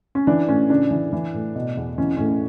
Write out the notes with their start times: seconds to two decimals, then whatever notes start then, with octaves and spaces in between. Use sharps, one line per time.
0.15 C#4
0.27 E3 D4
0.48 A2 C#4
0.70 C#3 D4
0.91 E3
1.13 E3
1.34 A2
1.55 B2
1.77 E2
1.98 E3 C#4
2.17 A2 C#4